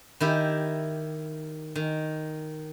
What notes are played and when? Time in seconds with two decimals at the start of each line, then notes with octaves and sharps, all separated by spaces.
0.21 D#3 E4 G4
1.75 D#3